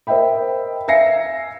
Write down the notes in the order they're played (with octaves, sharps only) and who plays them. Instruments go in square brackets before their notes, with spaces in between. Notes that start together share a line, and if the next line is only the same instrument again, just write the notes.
[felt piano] A#4 C5 D#5 E5 G5 B5
E5 F5 G#5 A#6 C7 C#7